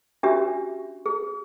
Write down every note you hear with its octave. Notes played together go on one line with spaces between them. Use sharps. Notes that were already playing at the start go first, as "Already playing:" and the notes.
C#4 D4 F#4 G4 E5
G#4